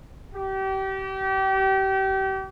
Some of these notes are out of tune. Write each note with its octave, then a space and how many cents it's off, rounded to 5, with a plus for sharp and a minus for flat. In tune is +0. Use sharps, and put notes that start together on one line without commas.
G4 -30